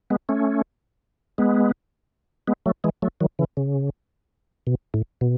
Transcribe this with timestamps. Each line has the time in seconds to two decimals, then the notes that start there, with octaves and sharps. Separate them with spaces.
0.10 G#3 B3
0.29 A3 C#4
1.38 G#3 B3
2.48 G#3 B3
2.66 F#3 A3
2.84 E3 G#3
3.02 F#3 A3
3.21 D#3 F#3
3.39 C#3 E3
3.57 C#3
4.67 B2
4.94 A2
5.21 B2